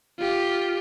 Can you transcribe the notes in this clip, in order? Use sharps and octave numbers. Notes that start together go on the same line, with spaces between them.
F4 G4